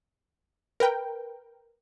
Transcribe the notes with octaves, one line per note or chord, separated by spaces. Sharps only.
A#4 B4 G5